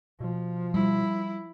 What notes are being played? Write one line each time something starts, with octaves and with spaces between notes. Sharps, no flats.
B2 F3
G3 E4